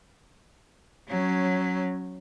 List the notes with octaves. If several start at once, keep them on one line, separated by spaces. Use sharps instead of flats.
F#3 C#4